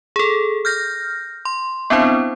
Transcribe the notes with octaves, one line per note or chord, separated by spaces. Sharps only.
G#4 A4
F6 G6 A#6
C6
B3 C4 D4 E4 C5